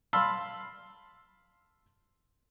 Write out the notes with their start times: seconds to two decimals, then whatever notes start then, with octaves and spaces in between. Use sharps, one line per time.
0.13 F5 A5 B5 C6 E6